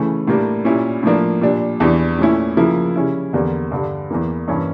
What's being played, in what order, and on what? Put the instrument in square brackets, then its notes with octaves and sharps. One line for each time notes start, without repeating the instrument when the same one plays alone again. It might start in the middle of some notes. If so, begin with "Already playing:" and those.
Already playing: [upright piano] C#3 E3 A3 C#4
A2 G3 A#3 D4
A#2 G3 C#4 E4
A2 F3 A#3 D4
A#2 G3 D4
E2 E3 G3 D4
A#2 A3 C#4 E4
C#3 F3 A#3 E4
C#3 G3 C#4 E4
E2 D3 G3 A#3
G2 D3 G3 D4
E2 E3 A#3
G2 E3 A#3 C#4 E4